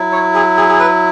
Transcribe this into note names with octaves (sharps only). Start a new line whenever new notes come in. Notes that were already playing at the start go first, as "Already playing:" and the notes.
Already playing: F#3 E4
C#5
G#4
G#4
G#4
B4